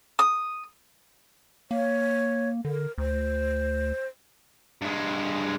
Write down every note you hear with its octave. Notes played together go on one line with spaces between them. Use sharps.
D#6
A#3 C#5
D3 A#4
D2 C5
G2 G#3